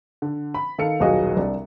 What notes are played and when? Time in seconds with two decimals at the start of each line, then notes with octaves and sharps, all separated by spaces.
0.22 D3
0.54 B5
0.78 D#3 A4 F5 C#7
1.00 D#1 B1 F4 F#4 G#4 D#5
1.37 C2 D4